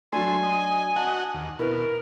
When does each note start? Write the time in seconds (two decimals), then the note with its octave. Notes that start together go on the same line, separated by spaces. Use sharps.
0.12 F#3 A3 D4 G#5 C6
0.43 D#5
0.96 F#4 D#5 F#5 A5
1.34 D#2
1.59 B2 E4 A#4 B4